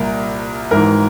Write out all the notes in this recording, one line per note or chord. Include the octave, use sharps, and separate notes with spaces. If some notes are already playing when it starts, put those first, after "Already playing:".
Already playing: C2 A#2 A#4
G#1 G#2 E3 A#4